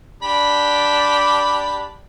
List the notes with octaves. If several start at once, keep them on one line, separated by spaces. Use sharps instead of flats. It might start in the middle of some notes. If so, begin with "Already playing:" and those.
D4 G4 B5